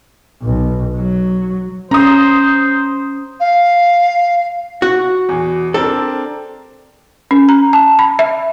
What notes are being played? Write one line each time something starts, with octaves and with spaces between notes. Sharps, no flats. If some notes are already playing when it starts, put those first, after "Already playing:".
B1
F#3
C#4 C5 A#5 D#6
F5
F#4
E2 B2
C4 D4 A4 A#4
C#4
A#5
A5
B5
E5